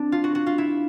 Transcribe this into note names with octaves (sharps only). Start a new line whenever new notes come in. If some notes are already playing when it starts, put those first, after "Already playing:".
Already playing: C4 D4
F4
F#4
F#4
F4
E4